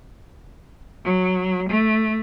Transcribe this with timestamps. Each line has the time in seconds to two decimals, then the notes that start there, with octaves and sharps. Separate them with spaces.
1.05 F#3
1.69 A3